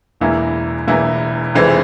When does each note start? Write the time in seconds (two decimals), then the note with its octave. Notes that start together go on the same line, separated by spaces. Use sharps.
0.21 E1 E2 E3 A#3 E4
0.87 E1 E2 E3 A#3 E4
1.54 F1 F2 E3 G#3 C4